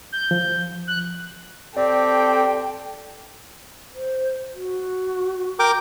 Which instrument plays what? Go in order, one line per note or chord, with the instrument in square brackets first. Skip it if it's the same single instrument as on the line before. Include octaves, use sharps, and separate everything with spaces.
[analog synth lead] G6
[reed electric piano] F3
[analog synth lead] F#6
[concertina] C4 G4 [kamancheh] A4 G5 [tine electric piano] D5
[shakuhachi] C5
F#4
[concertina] A#4 G5 D6